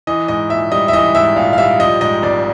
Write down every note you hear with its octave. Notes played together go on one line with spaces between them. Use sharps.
E3 D#5
G#2 D#5
A#1 E5
G3 D#5
E5
E3 D#5
G#2 E5
A#1 F5
F5
G3 E5
F3 D#5
G#2 D#5
G#1 D5